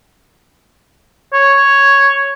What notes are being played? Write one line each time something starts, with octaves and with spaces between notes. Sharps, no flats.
C#5